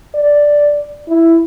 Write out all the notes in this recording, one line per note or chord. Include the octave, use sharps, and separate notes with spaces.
D5
E4